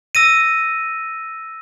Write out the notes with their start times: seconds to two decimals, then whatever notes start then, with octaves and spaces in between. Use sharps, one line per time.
0.15 E6 A#6 D#7